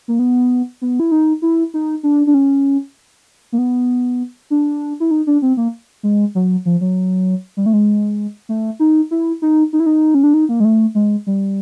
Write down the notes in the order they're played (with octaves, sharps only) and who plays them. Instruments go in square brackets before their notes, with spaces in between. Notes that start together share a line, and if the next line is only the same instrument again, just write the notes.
[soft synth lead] A#3
B3
B3
E4
D#4
E4
D#4
D4
D4
C#4
A#3
B3
D4
E4
D#4
D4
C4
A#3
G#3
F#3
F3
F#3
G3
A3
G#3
A3
D#4
E4
D#4
D#4
E4
D#4
C#4
D4
D#4
A#3
G#3
A3
G#3
G3